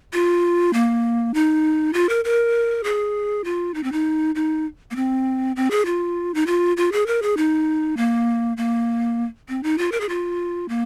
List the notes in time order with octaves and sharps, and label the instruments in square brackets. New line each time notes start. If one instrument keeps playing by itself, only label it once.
[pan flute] F4
A#3
D#4
F4
A#4
A#4
G#4
F4
D#4
C4
D#4
D#4
A#3
C4
C4
G#4
F4
D#4
F4
F4
G#4
A#4
G#4
D#4
A#3
A#3
C4
D#4
F4
A#4
G#4
F4
A#3